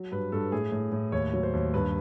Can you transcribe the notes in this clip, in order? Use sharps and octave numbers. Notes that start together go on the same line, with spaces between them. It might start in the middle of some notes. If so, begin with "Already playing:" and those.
Already playing: F#3
G2 B4
G2 A4
A2 G#4
A2
A2
D#2 C#5
F#3
C5
D#2
G2 B4